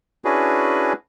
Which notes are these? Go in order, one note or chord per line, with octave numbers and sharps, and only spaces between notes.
C#4 D4 E4 F#4 G#4 B4